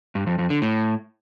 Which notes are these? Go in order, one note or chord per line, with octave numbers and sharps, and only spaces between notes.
G2
F2
F2
D3
A2